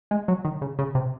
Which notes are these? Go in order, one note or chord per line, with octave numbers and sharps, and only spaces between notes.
G#3
F#3
D#3
C#3
C#3
C3